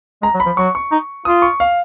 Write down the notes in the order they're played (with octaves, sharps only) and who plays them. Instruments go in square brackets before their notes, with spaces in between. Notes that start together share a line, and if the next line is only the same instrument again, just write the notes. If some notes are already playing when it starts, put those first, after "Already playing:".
[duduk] G#3 [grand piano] A#5
[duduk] F#3
[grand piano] B5
[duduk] F3
[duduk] F#3 [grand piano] C#6
[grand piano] C#6
[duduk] D#4
[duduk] F4 [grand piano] D#6
[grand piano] C#6
F5